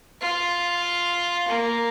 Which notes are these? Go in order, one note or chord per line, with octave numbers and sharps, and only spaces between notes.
F4
A#3